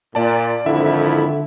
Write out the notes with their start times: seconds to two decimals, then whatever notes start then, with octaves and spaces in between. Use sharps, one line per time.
0.15 A#2 D5 A5
0.66 G#1 F2 D3 E4 E5